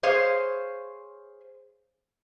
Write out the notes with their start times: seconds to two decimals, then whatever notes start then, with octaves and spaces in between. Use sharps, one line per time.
0.03 G#4 C5 C#5 F5